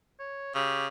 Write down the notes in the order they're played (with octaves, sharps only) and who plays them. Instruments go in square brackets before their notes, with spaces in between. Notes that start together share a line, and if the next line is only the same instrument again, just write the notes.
[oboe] C#5
[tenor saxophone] C#3 [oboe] G4